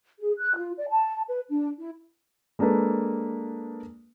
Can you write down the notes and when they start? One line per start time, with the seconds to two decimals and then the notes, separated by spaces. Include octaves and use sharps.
0.20 G#4
0.39 F#6
0.56 F4
0.77 D5
0.89 A5
1.28 B4
1.49 D4
1.79 E4
2.59 G#3 A#3 D4 A4 B4